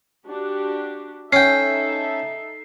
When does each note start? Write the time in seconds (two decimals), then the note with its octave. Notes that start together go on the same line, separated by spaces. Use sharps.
0.26 D4 F#4 G4
1.33 C#4 D#4 A4 E5 G5 C7